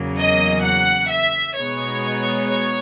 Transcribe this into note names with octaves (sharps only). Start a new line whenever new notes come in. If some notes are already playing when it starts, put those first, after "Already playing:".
Already playing: E2 C#3 F#3 A#3
D#5
F#5
E5
B2 G#3 B3 D#4 C#5
C#5